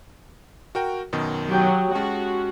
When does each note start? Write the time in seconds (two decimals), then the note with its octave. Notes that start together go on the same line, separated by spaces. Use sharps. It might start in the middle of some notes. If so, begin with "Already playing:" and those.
0.75 F#4 A#4 G5
1.12 F#2 B2 D#3
1.51 F#3 G4 G5 D#6
1.95 G#3 C#4 F#4 A5